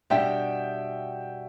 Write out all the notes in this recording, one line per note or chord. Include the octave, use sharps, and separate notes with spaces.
B2 G3 D4 G4 E5 G5